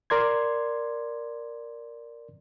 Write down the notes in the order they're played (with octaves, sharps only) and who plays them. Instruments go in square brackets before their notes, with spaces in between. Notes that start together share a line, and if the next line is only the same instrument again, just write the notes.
[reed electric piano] A#4 D5 C6 G#6